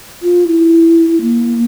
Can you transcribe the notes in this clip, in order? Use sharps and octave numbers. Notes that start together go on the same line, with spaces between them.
F4
E4
A#3